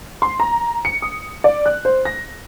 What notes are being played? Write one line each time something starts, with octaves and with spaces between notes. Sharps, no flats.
C6
A#5
C#7
D#6
D5
F#6
C5
A#6